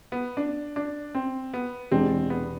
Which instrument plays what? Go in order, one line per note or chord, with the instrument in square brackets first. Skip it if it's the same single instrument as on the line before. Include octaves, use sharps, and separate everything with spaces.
[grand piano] B3
D4
D4
C4
B3
[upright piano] E1 E2 C3 G#3 D4 [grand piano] C4
[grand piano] B3